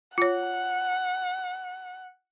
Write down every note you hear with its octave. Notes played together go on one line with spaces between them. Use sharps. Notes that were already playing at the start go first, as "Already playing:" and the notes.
F4 C#5 F#5